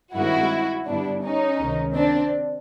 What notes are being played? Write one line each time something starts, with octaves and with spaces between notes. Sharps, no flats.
G2 D#3 G#3 C4 E4 F#4
G2 D3 G3 B3 D4 E4
C#4 D#4
C#2 C3 D#3 G#3
C4 D4